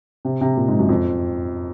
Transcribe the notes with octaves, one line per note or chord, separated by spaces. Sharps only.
C3
C3
A#2
G#2
F#2
F2